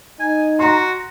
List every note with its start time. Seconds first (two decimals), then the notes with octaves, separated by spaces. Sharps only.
0.20 D#4 G#5
0.59 F#4 A#5 C6